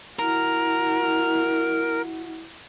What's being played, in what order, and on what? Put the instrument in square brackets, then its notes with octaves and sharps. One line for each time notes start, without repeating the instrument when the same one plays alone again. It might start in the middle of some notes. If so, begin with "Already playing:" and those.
[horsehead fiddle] E4 F#4 [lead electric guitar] A#4